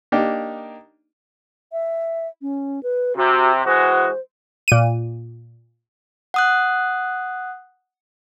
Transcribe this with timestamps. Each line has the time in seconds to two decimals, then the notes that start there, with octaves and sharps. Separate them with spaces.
0.12 A#3 D4 D#4 G4
1.72 E5
2.42 C#4
2.83 B4
3.16 C3 F#4
3.65 E3 G#3 F#4 C5
4.68 A#2 D#7
6.34 F#5 D#6 F#6